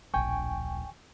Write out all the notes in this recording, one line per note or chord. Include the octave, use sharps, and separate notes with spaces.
D1 A#1 G5 G#5 C#6